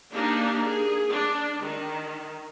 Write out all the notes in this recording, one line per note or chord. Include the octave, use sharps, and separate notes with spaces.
A#3 D4 D#4 G4 A#4
G#4
D4
D#3